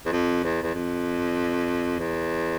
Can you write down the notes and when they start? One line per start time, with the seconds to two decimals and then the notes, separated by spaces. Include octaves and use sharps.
0.06 E2
0.12 F2
0.43 E2
0.63 E2
0.75 F2
1.99 E2